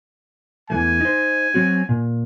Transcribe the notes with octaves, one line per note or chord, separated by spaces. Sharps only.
E2 E3 A3 G#5
D#4 C5
F#3 C4 F#4
A#2